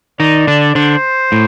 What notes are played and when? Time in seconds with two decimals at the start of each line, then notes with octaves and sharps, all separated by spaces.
0.20 D#3 D#4 D5
0.47 D3 D4
0.75 D3 D4 C5
1.32 A2